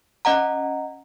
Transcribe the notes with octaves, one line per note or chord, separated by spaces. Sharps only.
C#4 D#5 F#5 A#5